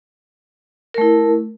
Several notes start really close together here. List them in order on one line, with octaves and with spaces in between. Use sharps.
A#4 A3 E4